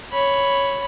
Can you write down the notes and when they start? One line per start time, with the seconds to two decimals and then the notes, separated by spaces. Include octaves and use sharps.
0.12 C#5 B5